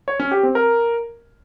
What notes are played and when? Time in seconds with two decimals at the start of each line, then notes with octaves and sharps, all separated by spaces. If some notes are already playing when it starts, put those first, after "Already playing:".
0.08 C#5
0.20 C#4
0.31 G4
0.43 C4
0.55 A#4